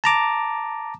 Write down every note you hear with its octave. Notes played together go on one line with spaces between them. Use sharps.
A5 A#5 D6